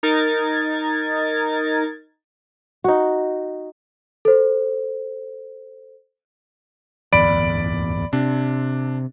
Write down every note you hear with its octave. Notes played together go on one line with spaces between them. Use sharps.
D#4 A#4 G#6 A6
D#4 F#4
A4 C5
D1 G1 E2 D5 B5 D7
C3 D4